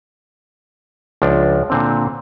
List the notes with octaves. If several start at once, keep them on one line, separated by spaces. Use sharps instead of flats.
C#2 F3 D4
A#2 D3 C4